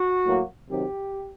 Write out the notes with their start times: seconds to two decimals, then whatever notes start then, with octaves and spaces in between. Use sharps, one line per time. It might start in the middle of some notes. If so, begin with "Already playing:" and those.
Already playing: F#4
0.24 A2 F#3 A#3
0.69 C3 D#3 F#3 C4 G4